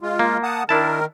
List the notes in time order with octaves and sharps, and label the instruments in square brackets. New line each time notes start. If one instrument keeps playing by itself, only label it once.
[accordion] G#3 F4
[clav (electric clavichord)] A#3
[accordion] F#5 A5 D#6
[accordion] D#3 A#4 [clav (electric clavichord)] D4 E4 A5